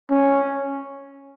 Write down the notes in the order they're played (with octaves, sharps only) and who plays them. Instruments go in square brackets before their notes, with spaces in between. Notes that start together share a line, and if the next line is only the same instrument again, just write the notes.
[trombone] C#4